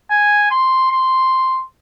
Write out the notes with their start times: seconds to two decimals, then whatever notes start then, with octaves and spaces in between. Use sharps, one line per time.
0.11 G#5
0.51 C6
0.91 C6